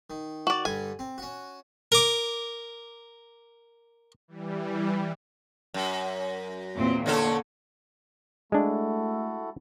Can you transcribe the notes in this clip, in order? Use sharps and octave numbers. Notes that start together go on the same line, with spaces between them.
D#3
F#4 D5
G2 D3 G3 G#5
C4
C#4 F#4
A#4 D6
E3 G3
F#2
E2 A#2 C4
D3 A#3 C#4 A4
G#3 A3 D4 E4 F#4 A4